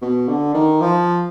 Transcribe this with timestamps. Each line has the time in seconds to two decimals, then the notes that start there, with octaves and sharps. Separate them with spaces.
0.02 B2
0.28 D3
0.54 D#3
0.81 F3